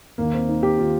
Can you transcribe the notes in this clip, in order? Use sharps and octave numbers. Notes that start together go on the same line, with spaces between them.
D#2 D#3 A#3
C4
D#4
G4
D#3 F4